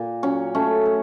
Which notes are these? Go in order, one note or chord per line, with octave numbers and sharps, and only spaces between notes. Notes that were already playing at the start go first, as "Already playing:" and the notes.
Already playing: A#2
F#3 C#4
A3 C#4
A3